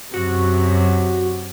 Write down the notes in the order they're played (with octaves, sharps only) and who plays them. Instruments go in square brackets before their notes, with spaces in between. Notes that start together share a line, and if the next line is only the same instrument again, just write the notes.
[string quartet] F#2 C3 [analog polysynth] F#4